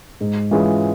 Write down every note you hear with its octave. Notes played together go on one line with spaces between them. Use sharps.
G#2
E3 G#3 C#4 F4